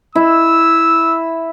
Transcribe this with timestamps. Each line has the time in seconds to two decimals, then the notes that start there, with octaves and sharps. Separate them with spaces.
0.15 E4 E6